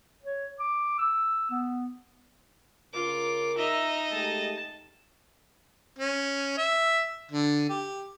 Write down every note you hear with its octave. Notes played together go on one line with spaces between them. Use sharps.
C#5
D6
E6
B3
C#3 F4 A#4 D6
D#4 D#5 E5 A#5
G#3 A3 G4 A5
C#4
E5
D3
G4